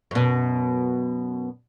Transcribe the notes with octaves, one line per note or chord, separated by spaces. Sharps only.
F#2 B2